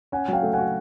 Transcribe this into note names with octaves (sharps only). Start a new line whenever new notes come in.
C#4 F#5 G#5
F#3 F5 G5
A3
F#4 F#5 G#5